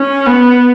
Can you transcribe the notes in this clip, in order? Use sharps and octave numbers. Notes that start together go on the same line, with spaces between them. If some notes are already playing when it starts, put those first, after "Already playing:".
Already playing: C#4
B3